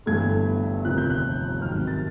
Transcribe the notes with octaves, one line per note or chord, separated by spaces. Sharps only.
G1 G2 E3 A3 G#6
F1 D#2 D3 F3 F#6
G6
F#6
G#1 G#2 D#3 F#3 F6
A6